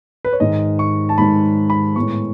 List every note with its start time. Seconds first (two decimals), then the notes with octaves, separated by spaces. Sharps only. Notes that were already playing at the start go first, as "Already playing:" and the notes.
0.25 B4
0.33 C#5
0.40 G#2 D#3 G#3 D#5
0.79 C#6
1.09 A5
1.18 G#2 D#3 G#3 B5
1.70 B5
1.96 A2 G#3 B3 C#6